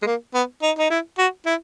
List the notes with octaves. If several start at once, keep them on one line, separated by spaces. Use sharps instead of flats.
G#3
A#3
B3
D#4
D#4
E4
F#4
E4